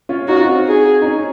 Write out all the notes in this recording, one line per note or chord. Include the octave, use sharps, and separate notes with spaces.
C#4 F4
D#4 F#4
F4
C4 D#4
G#4
D#4
C#4